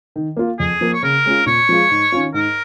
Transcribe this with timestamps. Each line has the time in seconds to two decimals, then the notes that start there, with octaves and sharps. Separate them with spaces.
0.16 D#3
0.37 A#3 F4
0.59 F2 G#4
0.81 F3 A#3
0.94 C#5
1.03 C#3 A#4
1.25 G#3 C#4 F4
1.46 A#2 C#5
1.69 F3 G#3 F4
1.91 G#2
2.12 D#3 C#4 F4
2.34 G#2 A#4